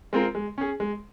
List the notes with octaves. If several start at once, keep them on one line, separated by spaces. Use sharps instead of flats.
G#3 C4 F4 A#4
G#3
C#4 G#4
G#3